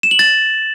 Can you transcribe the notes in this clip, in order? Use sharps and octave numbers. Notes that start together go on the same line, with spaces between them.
E7
F#7
A6